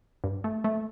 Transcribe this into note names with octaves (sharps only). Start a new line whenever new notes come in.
G2
A3
A3